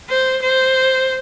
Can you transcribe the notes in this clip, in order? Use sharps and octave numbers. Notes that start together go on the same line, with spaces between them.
C5
C5